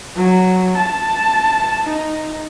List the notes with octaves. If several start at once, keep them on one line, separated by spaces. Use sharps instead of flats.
F#3
A5
D#4